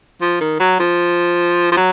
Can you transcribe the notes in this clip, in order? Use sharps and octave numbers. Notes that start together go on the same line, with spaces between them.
F3
D#3
F#3
F3
F3
F#3